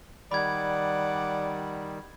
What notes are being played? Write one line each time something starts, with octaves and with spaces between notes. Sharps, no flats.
D#3 G3 D5 F#5 B5 G#6